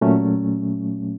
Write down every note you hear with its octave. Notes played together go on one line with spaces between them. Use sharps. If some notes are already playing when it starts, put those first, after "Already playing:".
A#2 F#3 A3 C#4